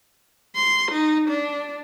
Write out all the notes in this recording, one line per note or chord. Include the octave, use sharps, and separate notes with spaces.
C6
D#4
D4